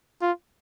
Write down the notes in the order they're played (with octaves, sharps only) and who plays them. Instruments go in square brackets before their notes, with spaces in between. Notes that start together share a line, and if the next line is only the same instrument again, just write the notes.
[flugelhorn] F4